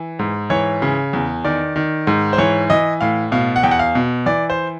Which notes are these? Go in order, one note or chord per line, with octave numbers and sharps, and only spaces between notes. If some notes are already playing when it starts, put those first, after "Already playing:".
Already playing: E3
G#2
E3 C#5
C#3
E2
D#3 D5
D#3
G#2
C5
E3 C#5
E3 D#5
A2 F5
B2 F5
F#5
E2 G5
F#5
F5
B2
E3 D5
C5